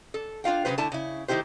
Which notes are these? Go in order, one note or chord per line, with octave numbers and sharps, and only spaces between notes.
A4
D4 F4 F5 G5
C#3 F#3 G#3 B3 B4 C5
D3 A3 E4 A5
C#3 E4
D#3 A3 E4 G4 C5